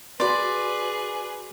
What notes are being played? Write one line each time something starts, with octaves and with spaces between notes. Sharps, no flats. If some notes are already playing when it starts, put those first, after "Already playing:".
F#4 G#4 B4 D5 B5 C6